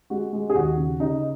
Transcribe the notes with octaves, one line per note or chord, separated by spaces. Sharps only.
G#3 F#4
G#3
G#4
D#2 F#4
C#3
C#3 D#4